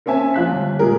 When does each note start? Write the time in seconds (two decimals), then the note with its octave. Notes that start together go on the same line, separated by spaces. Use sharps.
0.06 A#3 C4 C#4 E5 G#5 A5
0.34 A#1 F4 F#6 B6
0.52 G1
0.79 A#2 G#3 G#4 A#4